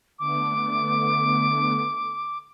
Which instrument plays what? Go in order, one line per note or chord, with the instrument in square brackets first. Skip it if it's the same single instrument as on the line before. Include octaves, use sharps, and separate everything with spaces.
[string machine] D3 A3 B3 [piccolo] D6